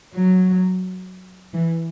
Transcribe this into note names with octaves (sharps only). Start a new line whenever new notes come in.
F#3
E3